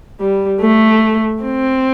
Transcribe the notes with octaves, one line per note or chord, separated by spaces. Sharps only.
G3
A3
C4